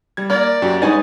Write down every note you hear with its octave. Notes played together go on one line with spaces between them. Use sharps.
G3 G#6
A#3 A#4 D5
F#2 F#4 G4
G#3 B3 D#4 C#5 G#5 A6